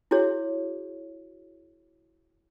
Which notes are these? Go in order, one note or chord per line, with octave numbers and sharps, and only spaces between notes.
E4 F#4 G#4 C#5